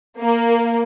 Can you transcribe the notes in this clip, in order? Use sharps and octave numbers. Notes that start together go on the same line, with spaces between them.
A#3